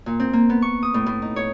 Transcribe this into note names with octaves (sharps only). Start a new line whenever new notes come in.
A#2
C4
A#3
B3
C#6
D#6
A2
A2
D#4
C#5